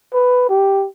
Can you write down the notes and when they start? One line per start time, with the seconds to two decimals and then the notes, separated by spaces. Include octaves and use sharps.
0.14 B4
0.49 G4